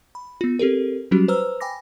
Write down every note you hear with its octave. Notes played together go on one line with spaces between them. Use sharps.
B5
B3 F4
C4 G4 A4 A#4
F#3 G3 C#4 F#4 G4
B4 C5 A#5 E6 F6
G5 G#5 B5 D6 A#6